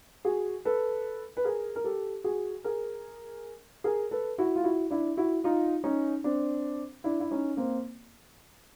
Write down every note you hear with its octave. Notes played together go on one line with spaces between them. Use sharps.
F#4 G#4
A4 B4
B4
G#4 A#4
A#4
G4 A4
F#4 G#4
G#4 A#4
G#4 A#4
A4 B4
E4 F#4
F4
E4 F#4
D4 E4
E4 F#4
D#4 F4
C#4 D#4
C4 D4
D4 E4
E4
C#4 D#4
A#3 C4